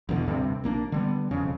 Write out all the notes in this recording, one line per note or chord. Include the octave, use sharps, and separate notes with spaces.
A1 E2 B2 D3
D2 G2 C3 C4
A#1 A#3 C4 D4
D3 G3 B3
E1 F2 C#3